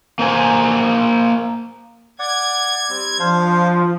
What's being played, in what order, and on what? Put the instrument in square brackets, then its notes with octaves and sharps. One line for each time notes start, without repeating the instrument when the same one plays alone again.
[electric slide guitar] A#3 C5 G#5
[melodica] D5 F#5 [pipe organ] G#6
[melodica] G3 C4
[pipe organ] F3 [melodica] D4 C5 F5